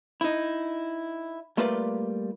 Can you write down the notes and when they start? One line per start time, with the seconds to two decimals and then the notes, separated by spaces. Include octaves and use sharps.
0.21 D#4 E4
1.57 G3 A3 A#3 F4 B4 D5